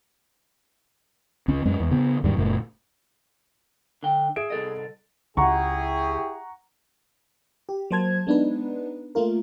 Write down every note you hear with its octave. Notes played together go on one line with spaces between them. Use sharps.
C#2 C#4
F#2 G#3 C#4
E2
C#3 B3
D#2 G#2 G3 G#3
F#1 A#2 A3
D3 G5
G#4 E5 D7
C2 A4 D#5
C#2 E4 G4 G#4 F#5 A#5 C#6
G4
F#3 A#3 C5 A5 G#6
G#3 B3 D4 D#4 B4
A3 A#3 F4 A#4